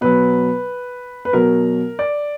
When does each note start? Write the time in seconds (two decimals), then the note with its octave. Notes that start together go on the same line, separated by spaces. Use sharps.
0.01 B2 F#3 B4
1.25 B4
1.33 B2 F#3 A#4
1.99 D5